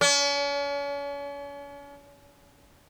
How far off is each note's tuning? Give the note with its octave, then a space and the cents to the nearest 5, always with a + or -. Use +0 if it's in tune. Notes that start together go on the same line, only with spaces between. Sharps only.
C#4 +40